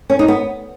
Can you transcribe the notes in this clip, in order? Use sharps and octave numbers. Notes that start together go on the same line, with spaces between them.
C#4
D#4
B3